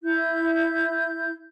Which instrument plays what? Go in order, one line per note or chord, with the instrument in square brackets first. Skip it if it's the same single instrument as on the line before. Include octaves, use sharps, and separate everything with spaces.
[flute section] E4 G6